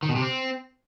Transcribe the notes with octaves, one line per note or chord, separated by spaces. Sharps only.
D#3
B2
C3
C4